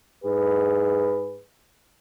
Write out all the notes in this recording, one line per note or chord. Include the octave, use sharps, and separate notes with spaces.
G#2 G#4 B4